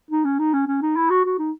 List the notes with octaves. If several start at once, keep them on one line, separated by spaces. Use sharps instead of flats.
D#4
C#4
D#4
C#4
C#4
D#4
E4
F#4
F#4
D#4